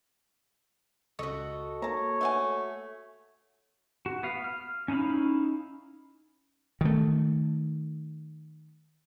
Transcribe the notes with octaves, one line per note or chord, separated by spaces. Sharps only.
C#2 F#4 A4 D#5 C#6
A#3 C#5 A5 A#5
A3 F#5 G#5
F#4
B3 F5
F6
C#4 D#4 E4 F5 B5
D#3 A3